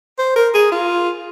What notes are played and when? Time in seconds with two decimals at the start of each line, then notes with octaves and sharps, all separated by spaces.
0.19 C5
0.36 A#4
0.54 G#4
0.72 F4